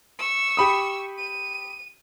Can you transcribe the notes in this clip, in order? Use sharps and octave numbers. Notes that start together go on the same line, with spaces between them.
C#6 E6
G4 B5 D#6
D#7